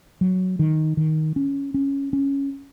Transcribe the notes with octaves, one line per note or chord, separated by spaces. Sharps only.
F#3
D#3
D#3
C#4
C#4
C#4